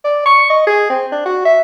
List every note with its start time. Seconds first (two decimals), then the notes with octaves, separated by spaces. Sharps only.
0.05 D5
0.26 C#6
0.50 D#5
0.67 G#4
0.90 C4
1.12 D4
1.25 F#4
1.45 E5